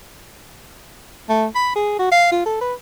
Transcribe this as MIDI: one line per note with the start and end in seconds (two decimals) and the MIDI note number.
1.29 1.46 57
1.55 1.72 83
1.76 1.96 68
1.99 2.10 66
2.12 2.29 77
2.32 2.44 65
2.46 2.58 69
2.61 2.74 71